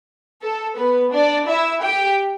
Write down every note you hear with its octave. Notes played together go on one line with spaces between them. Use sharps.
A4
B3 B4
D4 D5
E4 E5
G4 G5